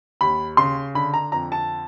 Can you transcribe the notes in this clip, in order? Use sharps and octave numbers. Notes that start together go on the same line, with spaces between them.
D#2 B5
C#3 C6
D3 B5
A#5
F2 A#5
A5